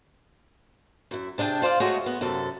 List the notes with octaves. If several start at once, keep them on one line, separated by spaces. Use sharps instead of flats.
F#2 E4
C3 D4 G#4 G5 A5
F4 C5 D5 F5
G#3 A3 F#4 G#4 C#5 D#5
B3
F#2 C3 A4